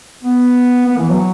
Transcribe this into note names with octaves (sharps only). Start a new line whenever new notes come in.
B3
B3
E3
F#3